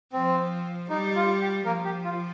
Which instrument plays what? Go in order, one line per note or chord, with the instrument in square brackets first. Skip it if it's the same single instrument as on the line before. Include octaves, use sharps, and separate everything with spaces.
[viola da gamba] F3 [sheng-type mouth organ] C4
[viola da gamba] G3 [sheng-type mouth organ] D#4
[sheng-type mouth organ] F4
G4
[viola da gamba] F3 [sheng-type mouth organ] A#3 A#4
[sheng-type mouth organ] G4
F4